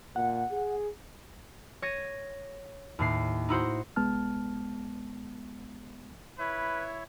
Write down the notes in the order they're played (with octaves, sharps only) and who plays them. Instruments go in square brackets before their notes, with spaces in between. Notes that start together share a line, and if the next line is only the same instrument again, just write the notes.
[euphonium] A#2 [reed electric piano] F#5
[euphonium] G#4
[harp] C#5 A#6 D#7
D#2 A2 C7
D#4 E4 F#4 C5
[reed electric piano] C2 G#3 B3 A5 F6
[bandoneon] E4 C#5 E5 [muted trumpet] B4